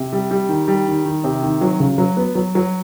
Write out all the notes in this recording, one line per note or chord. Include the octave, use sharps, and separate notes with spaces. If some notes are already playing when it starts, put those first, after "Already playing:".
Already playing: C3
G3
G3
D#3
G3
D#3
D#3
C3
D#3
F#3
C#3
F#3
B3
F#3
F#3